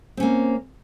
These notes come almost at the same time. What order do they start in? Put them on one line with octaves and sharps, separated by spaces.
C4 C#4 A#3